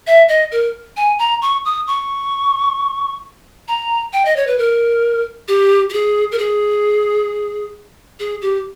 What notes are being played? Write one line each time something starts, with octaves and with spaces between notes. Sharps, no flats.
E5
D#5
A#4
G#5
A#5
C#6
D#6
C#6
A#5
G5
D#5
C#5
B4
A#4
G4
G4
G#4
A#4
G#4
G#4
G4